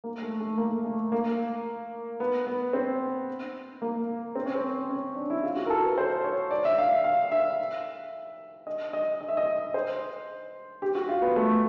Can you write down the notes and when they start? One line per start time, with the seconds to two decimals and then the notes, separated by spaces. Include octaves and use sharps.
0.04 A#3
0.22 A3
0.40 A3
0.58 A#3
0.85 A3
1.12 A#3
2.20 B3
2.47 B3
2.73 C4
3.82 A#3
4.35 C4
4.46 C#4
4.55 C4
4.89 C#4
5.16 D4
5.30 E4
5.43 F4
5.56 F#4
5.66 A#4
5.70 A4
5.84 B4
5.98 C5
6.24 C#5
6.51 D5
6.65 E5
6.78 F5
6.91 E5
7.04 F5
7.32 E5
8.67 D#5
8.93 D#5
9.21 D#5
9.28 E5
9.37 D#5
9.74 C5
10.82 G4
10.95 F#4
11.09 F4
11.22 B3
11.36 A3